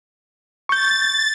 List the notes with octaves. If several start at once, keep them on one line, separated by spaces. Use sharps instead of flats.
C#6 G6 A6